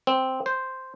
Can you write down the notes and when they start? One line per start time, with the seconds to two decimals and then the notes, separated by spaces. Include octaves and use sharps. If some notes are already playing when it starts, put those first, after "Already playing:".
0.07 C4
0.46 C5